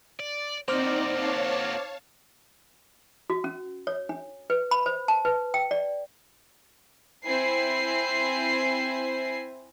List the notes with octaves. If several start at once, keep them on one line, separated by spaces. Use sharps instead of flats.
D5
A#3 C4 D#4 F#4 C5 D5 D6 F6
C#5 F5 A5
F#4
C#4
C#5
D4
B4
B5
C5
A5
B4
G5
D5
C4 E4 C5 G#5 C7